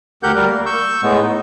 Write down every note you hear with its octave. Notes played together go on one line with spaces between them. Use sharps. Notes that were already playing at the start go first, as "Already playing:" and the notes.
D2 G4 A#4 F#5 G6
G3 A#4
A#3
C#6 E6 G6
A2 G#3 B3
D#4